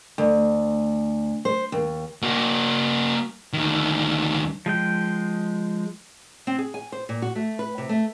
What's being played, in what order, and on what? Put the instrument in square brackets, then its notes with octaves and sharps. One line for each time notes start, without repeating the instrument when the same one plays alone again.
[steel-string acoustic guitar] D2
C5
D#2
[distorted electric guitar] A#3 F#4
D2 D#3
[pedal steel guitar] F3 G#3 G5
[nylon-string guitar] C4
G#4
G#5
C5
A#2
F#4
A3
B4
C3
A3